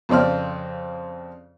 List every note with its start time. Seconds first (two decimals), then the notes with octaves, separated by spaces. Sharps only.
0.09 F2 C#3 C4 D5 F6